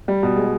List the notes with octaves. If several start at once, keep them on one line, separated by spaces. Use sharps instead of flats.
G3
B2
G#3